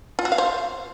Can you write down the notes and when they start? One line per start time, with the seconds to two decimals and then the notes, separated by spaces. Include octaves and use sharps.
0.19 F4
0.25 F#4
0.32 F5
0.38 C5